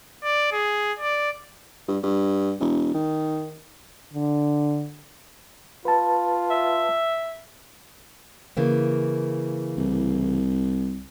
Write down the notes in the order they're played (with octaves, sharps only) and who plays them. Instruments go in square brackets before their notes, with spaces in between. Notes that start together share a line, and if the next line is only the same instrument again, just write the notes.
[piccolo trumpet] D5
G#4
D5
[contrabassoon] G2
G2
E1
D#3
[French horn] D3
[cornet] F4 [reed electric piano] B4 A5
[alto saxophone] E5
[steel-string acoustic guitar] C#3 E3 A#3
[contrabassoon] C2